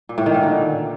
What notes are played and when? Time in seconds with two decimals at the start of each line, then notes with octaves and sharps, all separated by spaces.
0.09 A#2
0.18 A2
0.26 D#3
0.35 A#2
0.43 D3